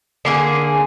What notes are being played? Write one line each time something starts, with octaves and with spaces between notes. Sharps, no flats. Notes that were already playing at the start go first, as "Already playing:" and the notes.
D3 A#3 G#4